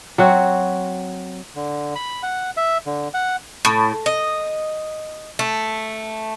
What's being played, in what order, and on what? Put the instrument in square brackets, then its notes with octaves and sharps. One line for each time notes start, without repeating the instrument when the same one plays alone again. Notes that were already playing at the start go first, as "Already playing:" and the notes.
[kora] F#3 C4 F#4
[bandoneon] D3
B5
F#5
E5
D3
F#5
[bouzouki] A2
D#5
A3